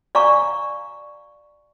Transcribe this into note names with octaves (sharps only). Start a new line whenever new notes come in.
D5 F5 G#5 A#5 C#6